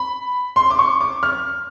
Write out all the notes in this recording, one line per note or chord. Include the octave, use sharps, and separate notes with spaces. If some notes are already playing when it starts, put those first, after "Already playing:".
Already playing: B5
C6
D6
C#6
D6
F6